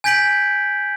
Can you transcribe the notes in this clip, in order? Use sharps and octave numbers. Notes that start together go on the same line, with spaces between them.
G#5 G6 G#6 B6 D7 F#7